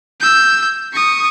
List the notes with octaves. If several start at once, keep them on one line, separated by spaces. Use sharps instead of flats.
E6 G6
C#6 D#6